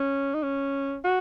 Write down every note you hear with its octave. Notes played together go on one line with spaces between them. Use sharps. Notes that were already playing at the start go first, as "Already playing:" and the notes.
Already playing: C#4
D#4
C#4
F#4